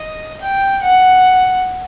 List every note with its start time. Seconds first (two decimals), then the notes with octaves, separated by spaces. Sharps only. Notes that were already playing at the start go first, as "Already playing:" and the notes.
Already playing: D#5
0.41 G5
0.83 F#5